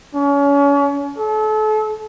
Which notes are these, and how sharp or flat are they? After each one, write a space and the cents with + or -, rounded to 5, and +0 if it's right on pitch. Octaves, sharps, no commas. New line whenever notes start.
C#4 +35
A4 -35